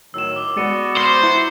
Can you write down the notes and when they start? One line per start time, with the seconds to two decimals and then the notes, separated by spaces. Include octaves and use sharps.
0.14 A2 D#3 F#3 E6 E7
0.36 D6 G7
0.57 G#3 B3 F#4 D5 A6 C#7 D#7
0.97 C5 D6 F6 E7
1.22 E4 F#5 A#5 C6